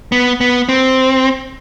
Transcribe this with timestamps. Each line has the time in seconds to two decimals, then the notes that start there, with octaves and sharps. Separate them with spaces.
0.12 B3
0.41 B3
0.69 C4